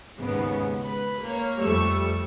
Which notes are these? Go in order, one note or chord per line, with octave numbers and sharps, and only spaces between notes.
D#2 G#2 C#3 B3
B4 B5
A#3 C#5
F2 G3 A3 C#6 E6